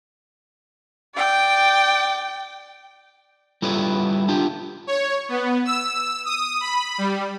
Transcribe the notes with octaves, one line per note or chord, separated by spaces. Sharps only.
D5 G5
G3 E4 F4 A4 B4 C#5
D4 F4 G4
C#5
B3
E6
D#6
B5
G3